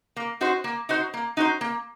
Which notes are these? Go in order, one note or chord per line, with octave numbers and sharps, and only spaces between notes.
A#3
D#4 F#4 C5
A#3
D#4 F#4 C5
A#3
D#4 F#4 C5
A#3